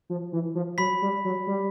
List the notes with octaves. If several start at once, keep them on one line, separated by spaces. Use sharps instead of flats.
F3
E3
F3
F#3 B5 B6
G3
F#3
G3